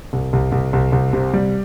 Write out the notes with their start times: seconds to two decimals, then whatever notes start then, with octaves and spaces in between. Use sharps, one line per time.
0.13 C2
0.33 C2
0.52 C2
0.73 C2
0.92 C2
1.13 C3
1.34 G3